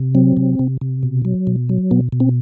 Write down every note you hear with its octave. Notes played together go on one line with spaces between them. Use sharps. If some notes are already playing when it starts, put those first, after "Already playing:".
Already playing: C3
F#3 C4
C3
C3
C3
B2
F#3
B2
F#3
B2 B3
B2
C4